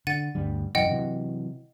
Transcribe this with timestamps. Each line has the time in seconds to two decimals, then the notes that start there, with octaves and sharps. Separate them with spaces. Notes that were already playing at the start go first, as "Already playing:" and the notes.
0.07 D3 F#5 A6 D#7
0.35 D2 G2 G3
0.75 E1 F#2 E3 D#5 F#5 G5
0.89 C3 E3 F#3